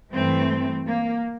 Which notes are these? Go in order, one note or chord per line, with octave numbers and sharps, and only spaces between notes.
G2 E3 A3 C4
A#3